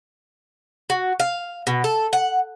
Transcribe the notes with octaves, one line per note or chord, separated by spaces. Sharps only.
F#4
F5
B2
A4
F#5